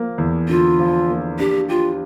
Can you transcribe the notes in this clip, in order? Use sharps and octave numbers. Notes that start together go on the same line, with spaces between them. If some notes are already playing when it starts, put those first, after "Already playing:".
Already playing: F3 A#3
E2
D3 F4
F3
A#3
D4 G4
F4 G4